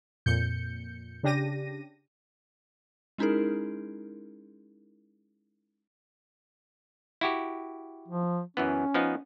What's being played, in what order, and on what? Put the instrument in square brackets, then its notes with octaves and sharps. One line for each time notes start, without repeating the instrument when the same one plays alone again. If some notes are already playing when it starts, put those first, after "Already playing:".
[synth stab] F2 A#2 G6 C#7
C#3 D4 G4 A#6 D#7
[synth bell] G#3 C#4 D#4 E4 G#4 A#4
[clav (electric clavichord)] E4 F#4 G4
[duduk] F3
[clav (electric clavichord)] F#2 E3 B3 [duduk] C#4
[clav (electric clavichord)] F3 B3 D#4